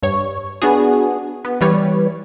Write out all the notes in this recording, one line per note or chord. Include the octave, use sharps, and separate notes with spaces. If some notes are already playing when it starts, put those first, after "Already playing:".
G2 C#5
B3 D4 F#4 G#4
B3
E3 G3 B4 C#5